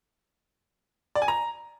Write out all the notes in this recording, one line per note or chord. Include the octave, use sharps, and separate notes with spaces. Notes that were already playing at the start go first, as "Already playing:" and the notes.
D5
G#5
A#5